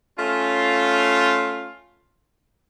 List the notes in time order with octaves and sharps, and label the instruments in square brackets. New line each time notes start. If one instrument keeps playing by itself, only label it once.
[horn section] A3 C#4 F4